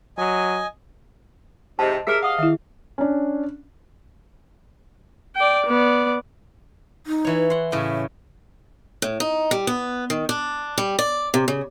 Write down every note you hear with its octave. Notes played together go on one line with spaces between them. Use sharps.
F#3 D#5 G#5
G#2 C3 D#5 A5
G4 G#4 A#4 C5 E5
D#5 F5 F#5
D#3 E4 E5
C#4 D4
D5 G5
B3 D5
D#4
E3 C#5
F#5 C6
A2 C#3 E5
A2
D#4
G3
B3
D#3
D4
G3
D5
C3
C#3